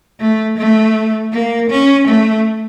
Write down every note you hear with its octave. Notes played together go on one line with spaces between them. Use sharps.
A3
A3
A#3
C#4
A3